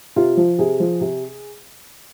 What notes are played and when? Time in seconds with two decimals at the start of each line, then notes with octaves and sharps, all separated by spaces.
0.16 C3 F4
0.37 F3
0.59 C3 G#4
0.80 F3
1.01 C3